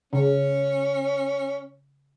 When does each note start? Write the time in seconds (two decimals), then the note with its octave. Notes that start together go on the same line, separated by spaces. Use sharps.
0.13 C#3 C#4